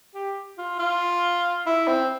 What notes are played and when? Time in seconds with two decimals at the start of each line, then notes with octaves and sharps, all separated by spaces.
0.15 G4
0.58 F4
0.79 F4
1.66 E4
1.88 C4